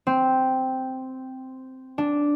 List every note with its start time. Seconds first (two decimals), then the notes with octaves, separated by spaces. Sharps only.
0.07 C4
1.98 D4